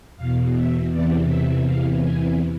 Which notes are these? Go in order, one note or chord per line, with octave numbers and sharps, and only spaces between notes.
E2 B2 F5
E5
E2 C3 E3 D5
E5
E2 C3 E3 F5
G#5